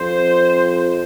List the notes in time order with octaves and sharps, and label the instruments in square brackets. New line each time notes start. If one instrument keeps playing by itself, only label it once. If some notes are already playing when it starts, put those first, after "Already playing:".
Already playing: [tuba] F2 [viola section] C5